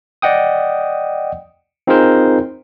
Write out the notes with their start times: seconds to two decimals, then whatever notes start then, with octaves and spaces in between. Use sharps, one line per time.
0.22 D5 D#5 F#5 G5 D#6
1.87 C4 D#4 F4 G#4 A#4 C5